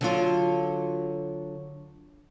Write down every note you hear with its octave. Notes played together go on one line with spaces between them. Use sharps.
D3 F#3 F4